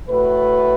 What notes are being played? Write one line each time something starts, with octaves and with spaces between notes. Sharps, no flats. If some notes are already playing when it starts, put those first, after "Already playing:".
A2 A3 F#4 B4